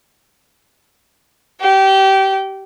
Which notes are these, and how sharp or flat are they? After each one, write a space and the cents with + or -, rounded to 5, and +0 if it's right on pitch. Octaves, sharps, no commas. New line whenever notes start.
G4 -25 G5 -25